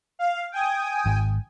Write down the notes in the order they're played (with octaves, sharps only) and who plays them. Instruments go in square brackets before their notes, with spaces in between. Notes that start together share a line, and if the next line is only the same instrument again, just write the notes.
[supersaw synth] F5
G5 G#5 D#6
[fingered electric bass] G#1